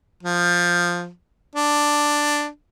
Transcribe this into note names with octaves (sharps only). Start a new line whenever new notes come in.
F3
D4